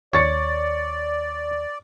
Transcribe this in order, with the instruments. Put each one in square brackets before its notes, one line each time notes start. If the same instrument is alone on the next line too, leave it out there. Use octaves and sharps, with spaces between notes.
[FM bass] D#2 [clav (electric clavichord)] C#5 [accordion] D5 [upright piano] C#6 A6 C#7